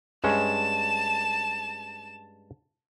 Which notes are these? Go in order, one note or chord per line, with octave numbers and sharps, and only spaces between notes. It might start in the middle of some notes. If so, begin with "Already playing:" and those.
G2 G#3 C#4 A5 E7